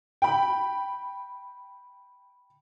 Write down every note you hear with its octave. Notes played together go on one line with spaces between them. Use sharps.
G5 B5